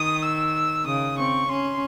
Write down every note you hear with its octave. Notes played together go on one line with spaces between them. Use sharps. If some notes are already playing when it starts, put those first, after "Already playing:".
Already playing: D#3 D#6
E6
C#3 D#6
C4 C#6
C#4 C6